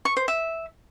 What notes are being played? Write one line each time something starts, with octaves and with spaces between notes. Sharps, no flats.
C#6
C5
E5